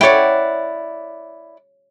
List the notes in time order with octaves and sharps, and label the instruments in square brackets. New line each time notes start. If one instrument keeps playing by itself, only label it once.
[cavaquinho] E4 D5 F#5 [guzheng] C#5 G5